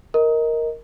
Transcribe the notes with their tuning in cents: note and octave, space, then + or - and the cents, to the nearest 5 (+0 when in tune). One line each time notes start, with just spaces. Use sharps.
A#4 +0 D#5 +15